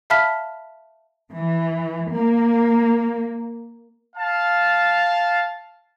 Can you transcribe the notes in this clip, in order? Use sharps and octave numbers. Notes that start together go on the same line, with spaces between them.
E5 F5 A5 B5 F6 B6
E3
A#3
F5 A5